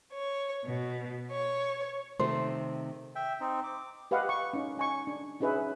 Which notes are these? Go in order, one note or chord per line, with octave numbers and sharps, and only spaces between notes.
C#5
B2
C#5
C3 D#3 A3 C5
E5 G5
C4 D#4
D6
G4 B4 D#5 F5 F#5
C#6
C#4 D#4
D#4 G#5 C#6
D4
C#4 D#4 G#4 B4 C#5 E5